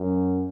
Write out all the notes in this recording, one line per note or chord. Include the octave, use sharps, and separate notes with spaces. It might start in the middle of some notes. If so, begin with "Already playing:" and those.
Already playing: F#2